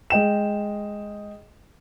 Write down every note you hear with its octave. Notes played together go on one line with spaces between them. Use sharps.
G#3 D#5 G5 E7